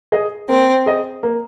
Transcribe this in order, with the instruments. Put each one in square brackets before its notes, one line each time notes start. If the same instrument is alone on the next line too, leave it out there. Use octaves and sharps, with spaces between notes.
[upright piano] G#4 D#5
[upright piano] A#3 [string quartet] C4
[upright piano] G#4 D#5
A#3